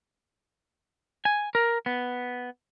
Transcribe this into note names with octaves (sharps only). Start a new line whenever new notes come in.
G#5
A#4
B3